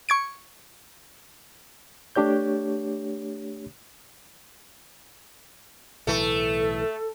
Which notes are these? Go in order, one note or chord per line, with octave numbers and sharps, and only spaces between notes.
C#6 G#6 D7
A3 D4 G4 C#5 G6
B1 A2 E3 A3 A4